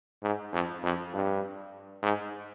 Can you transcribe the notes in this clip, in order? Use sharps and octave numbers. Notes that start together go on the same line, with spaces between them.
G#2
F2
F2
G2
G#2